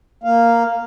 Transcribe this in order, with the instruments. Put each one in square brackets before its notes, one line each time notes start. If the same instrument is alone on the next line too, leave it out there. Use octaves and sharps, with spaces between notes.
[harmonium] A#3 F5